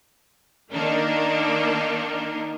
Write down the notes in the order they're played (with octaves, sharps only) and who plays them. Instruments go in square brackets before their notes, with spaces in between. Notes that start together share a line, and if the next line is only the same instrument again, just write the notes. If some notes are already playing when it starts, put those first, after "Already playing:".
[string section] D#3 A#3 D4 D#4